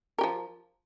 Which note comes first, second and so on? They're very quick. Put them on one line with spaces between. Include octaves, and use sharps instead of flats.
A#4 G4 F3